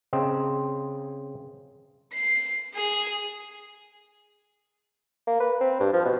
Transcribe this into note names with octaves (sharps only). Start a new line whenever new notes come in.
C#3 C4 D#5
C7
G#4
A#3
B4
C4
G2
F3
B2